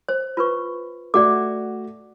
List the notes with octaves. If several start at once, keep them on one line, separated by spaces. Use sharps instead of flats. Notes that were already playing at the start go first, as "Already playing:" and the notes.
C5
F4 B4 C#6
A3 F#4 D5 F#5 D6